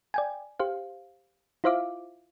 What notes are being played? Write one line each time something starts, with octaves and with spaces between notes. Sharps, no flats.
D5 G5 G#5
G4 C5 F5
E4 F4 C5 E5 F5 D6